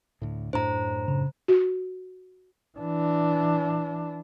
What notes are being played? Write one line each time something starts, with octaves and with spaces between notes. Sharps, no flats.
D2 A2
F#2 A2 D4 C5 A#5
C#3
F#4
E3 D4